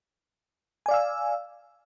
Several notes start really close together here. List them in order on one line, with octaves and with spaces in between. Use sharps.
G#5 D5 F5 E6